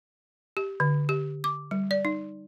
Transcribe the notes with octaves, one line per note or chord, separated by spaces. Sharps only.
G4
D3
G4
D6
G3
D5
D#4